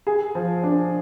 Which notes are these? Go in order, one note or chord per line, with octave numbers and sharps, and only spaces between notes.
G#4
F3
D4